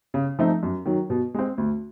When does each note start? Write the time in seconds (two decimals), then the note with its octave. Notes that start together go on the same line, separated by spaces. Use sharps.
0.14 C#3
0.39 F3 A3 C4 D#4
0.63 F#2
0.85 D#3 F#3
1.10 B2
1.34 G#3 C4
1.58 D2